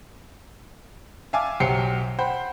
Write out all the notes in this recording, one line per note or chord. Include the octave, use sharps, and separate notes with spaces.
E5 F5 G#5 A5 D6
B1 F#3 G4 C5 C7 C#7
C5 F#5 G5 B5